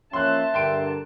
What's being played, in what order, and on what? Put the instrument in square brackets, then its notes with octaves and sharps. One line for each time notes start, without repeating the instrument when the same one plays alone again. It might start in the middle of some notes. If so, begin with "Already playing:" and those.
[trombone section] F3 A#3 C#4 [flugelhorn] E5 [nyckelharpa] A5 [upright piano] C6 F#6
[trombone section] G2 D3 A#4 [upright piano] G5 C6 D7